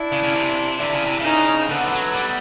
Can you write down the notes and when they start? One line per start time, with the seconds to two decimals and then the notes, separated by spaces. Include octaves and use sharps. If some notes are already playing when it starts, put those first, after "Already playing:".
Already playing: D4 E4
0.12 C#3
0.23 C#3
0.35 C3
0.79 D3 D4 E4
0.92 C#3
1.05 C3
1.20 C#3 C#4 D#4
1.38 D4
1.48 C#4
1.59 C4
1.69 D3 A3 B3
1.85 F3
1.92 F#3
2.15 G3